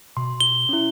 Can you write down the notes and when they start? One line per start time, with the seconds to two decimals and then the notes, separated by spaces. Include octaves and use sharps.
0.17 B2 C6
0.40 G7
0.69 C#4 E4